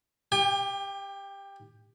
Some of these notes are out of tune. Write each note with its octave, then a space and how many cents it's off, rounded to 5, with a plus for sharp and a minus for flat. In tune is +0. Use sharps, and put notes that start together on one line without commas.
G4 +15 G5 +45